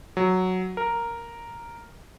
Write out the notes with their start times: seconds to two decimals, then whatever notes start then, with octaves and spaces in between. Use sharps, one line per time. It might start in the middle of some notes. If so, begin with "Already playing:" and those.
0.17 F#3
0.77 A#4